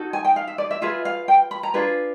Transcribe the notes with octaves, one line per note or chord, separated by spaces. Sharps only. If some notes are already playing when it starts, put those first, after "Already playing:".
Already playing: D#4 F#4 A4
G#5
G5
F5
E5
D5
E5
F4 G#4 B4 E5
F5
G5
B5
A#5
D4 F4 G#4 B4